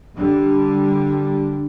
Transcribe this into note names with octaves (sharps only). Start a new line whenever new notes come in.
D3 G3 D4